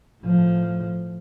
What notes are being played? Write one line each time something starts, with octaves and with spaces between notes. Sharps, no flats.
A2 F3